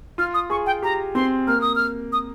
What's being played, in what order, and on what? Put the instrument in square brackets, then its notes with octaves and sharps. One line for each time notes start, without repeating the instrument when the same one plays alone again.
[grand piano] F4 [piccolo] F6
[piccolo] D#6
[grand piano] G#4 [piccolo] C#6
[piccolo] G5
[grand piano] G4 [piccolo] A#5
[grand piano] C4 [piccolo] C6
[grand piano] A#3 [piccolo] F6
[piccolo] D#6
F6
D#6